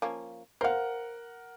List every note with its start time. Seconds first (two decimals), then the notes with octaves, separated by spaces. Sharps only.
0.02 F3 A#3 C#4
0.61 A#4 C5 F5 F#5